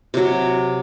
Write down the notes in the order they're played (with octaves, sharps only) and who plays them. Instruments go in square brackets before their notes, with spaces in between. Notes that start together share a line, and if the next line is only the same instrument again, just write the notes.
[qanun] C3 F#3